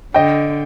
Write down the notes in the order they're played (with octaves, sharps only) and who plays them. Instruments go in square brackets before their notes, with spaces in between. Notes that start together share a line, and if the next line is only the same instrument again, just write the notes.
[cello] D3 [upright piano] D#5 G5